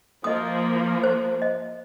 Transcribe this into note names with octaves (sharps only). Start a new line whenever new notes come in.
F3 A#3 D#5 D#6
C5
D#5